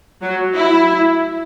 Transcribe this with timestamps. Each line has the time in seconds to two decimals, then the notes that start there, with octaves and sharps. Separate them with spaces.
0.22 F#3
0.55 E4